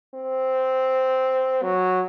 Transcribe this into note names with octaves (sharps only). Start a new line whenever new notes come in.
C4
F#3